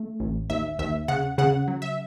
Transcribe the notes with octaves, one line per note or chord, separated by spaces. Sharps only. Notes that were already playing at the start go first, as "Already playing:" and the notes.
Already playing: A3
A1
D#2 E5
D#2 E5
C#3 F#5
C#3 F#5
F#3
E5